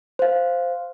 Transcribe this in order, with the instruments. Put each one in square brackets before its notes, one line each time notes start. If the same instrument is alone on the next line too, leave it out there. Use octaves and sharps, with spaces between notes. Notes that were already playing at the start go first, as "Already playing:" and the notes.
[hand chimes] C5 F5